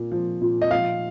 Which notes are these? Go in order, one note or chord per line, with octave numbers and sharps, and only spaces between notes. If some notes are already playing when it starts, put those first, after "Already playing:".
Already playing: A#2
F3
A#2
D#5
F3 F5